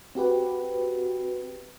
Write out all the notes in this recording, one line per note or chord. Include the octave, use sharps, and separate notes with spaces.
C4 F#4 G4 B4